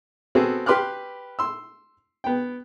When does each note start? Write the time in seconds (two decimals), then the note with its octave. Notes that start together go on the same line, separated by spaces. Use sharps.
0.35 B3 C4 F#4 G#4 A4
0.66 G4 B4 C6 D6 F6 F#6
1.39 C6 E6
2.24 B3 G5